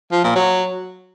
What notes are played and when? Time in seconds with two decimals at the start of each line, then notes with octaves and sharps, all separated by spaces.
0.12 F3
0.24 A#2
0.35 F#3